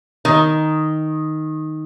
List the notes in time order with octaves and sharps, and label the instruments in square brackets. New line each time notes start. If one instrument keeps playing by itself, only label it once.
[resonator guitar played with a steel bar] D#3